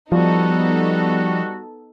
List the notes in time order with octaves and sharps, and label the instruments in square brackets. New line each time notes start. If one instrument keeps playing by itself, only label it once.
[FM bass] F3 [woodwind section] G3 F#4 [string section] B3 D#4 A4